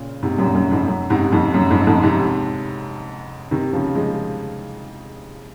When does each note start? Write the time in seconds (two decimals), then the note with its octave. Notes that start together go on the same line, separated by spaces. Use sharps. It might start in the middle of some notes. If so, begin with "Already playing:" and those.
Already playing: A#2 C#3
0.23 G#2 C3
0.38 F#2 A#2
0.55 F#2
0.71 F2 G#2
0.88 F#2
1.10 G#2 C3
1.32 F2 G#2
1.54 F#2
1.70 F2 G#2
1.87 F2 G#2
2.03 G#2 C3
3.51 C3 D#3
3.73 C#3 F3
3.95 F3 G#3